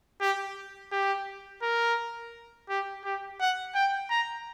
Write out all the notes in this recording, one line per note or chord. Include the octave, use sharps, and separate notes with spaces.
G4
G4
A#4
G4
G4
F#5
G5
A#5